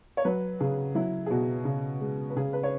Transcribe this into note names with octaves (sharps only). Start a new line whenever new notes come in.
C#5
F#3 B4
C#3 G#4
F#3 E4
G#4
B2 F#4
C#3
G#3
B4
C#3 G#4
B4
C#5